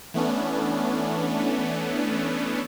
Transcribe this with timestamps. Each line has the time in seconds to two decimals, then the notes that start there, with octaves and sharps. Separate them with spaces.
0.14 E3 A3 B3 C#4 D4